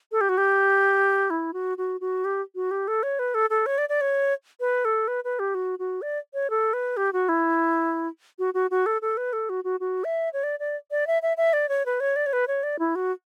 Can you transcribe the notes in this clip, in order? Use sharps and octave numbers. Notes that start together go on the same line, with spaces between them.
A4
G4
F#4
G4
E4
F#4
F#4
F#4
G4
F#4
G4
A4
C#5
B4
A4
A4
C#5
D5
D5
C#5
B4
A4
B4
B4
G4
F#4
F#4
D5
C#5
A4
B4
G4
F#4
E4
F#4
F#4
F#4
A4
A4
B4
A4
F#4
F#4
F#4
E5
C#5
D5
D5
D5
E5
E5
E5
D5
C#5
B4
C#5
D5
C#5
B4
C#5
D5
E4
F#4